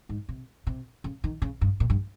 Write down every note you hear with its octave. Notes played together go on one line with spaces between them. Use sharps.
G#2
C3
C3
C#3
D#3
C#3
G2
A#2
G2